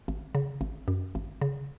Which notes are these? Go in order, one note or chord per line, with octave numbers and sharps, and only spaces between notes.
G#1
C#3
G#1
F#2
G#1
C#3